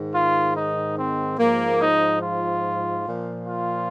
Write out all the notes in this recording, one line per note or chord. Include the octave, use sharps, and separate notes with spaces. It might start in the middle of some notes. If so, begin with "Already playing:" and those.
Already playing: G#2 D#3
F4
D#4
C4
G#2 F3 A#3
D#4
F4
A#2 F3
F4